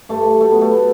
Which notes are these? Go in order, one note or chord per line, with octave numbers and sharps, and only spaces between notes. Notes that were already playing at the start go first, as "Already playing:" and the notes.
G2 A3
A3
F#3 A3
F#3 B3
A3
B3